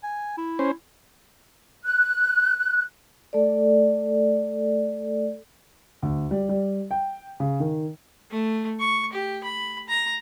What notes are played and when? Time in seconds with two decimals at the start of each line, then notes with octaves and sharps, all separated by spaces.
0.04 G#5
0.37 E4
0.59 C#4 C5
1.84 F#6
3.33 A3 A4 D5
6.02 D2
6.31 G3
6.49 G3
6.91 G5
7.40 C#3
7.60 D#3
8.31 A3
8.79 C#6
9.13 G4
9.44 B5
9.89 A#5